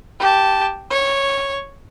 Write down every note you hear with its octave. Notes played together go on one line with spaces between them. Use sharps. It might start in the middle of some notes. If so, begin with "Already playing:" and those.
G4 A5
C#5